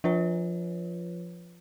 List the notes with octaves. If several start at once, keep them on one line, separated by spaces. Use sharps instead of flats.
F3 F4 B4 C#5